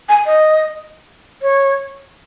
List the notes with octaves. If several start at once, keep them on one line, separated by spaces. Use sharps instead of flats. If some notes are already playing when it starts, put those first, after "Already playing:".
G#5
D#5
C#5